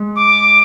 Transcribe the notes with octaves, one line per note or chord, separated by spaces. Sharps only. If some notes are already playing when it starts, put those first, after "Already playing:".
Already playing: G#3
D6